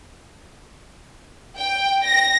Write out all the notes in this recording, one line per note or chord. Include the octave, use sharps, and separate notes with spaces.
G5
A#6